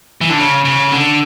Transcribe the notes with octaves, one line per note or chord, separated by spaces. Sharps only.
E3
D3
C#3
C#3
D3